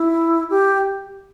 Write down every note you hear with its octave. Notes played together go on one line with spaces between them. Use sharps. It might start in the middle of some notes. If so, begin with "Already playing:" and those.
Already playing: E4
G4